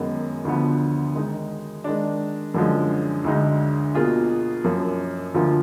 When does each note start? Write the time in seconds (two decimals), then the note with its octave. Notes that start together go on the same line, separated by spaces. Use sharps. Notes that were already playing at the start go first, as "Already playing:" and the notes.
Already playing: F#2 D#3 G#3 B3
0.45 D2 D3 F3 B3
1.15 D#3 G#3 D#4
1.84 D#3 G#3 D4
2.54 F#2 D3 F3 G#3
3.24 D2 D3 G#3 D#4
3.95 B2 A#3 F4 G#4
4.64 F#2 F3 A#3
5.34 D2 D3 F3 A#3 F4